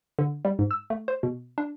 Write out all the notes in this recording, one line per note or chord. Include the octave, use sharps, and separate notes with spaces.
D3
G3
G#2
E6
A3
C5
B2
D4